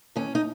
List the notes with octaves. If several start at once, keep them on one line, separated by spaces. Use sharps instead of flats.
D#2 C#4
D#4